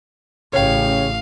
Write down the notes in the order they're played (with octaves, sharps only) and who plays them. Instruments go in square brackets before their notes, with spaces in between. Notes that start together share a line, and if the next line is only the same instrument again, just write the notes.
[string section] A1 [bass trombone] C#3 [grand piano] C#5 G5 [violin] F5